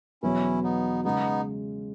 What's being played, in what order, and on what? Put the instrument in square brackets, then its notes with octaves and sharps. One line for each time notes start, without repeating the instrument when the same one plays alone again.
[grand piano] E2 B2 F#3 B3 [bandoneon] C#4 E4
[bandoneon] B3 D#4
[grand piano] C#3 G#3 [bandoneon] B3 D#4